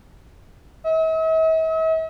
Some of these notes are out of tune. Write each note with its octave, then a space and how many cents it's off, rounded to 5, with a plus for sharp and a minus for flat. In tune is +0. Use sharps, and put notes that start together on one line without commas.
E5 -45